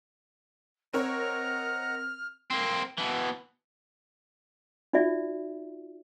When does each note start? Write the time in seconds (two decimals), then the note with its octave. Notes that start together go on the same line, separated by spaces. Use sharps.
0.93 C4 A#4 C#5 D#5 F#5 A#5 F6
2.50 A#3 C4
2.98 B2 E3
4.93 D#4 F4 F#4 D5 E5